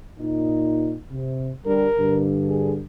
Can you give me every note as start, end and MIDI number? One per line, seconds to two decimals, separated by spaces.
0.19 0.96 46
0.19 0.96 63
1.11 1.51 48
1.66 1.88 50
1.66 1.88 55
1.66 2.23 70
1.99 2.84 43
1.99 2.84 50
2.48 2.73 68